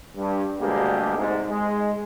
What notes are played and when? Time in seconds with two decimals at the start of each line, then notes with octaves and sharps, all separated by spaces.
0.16 G2
0.60 D2 B2 G3 G#3 A#3 G4
1.17 G#2 C3
1.49 G#3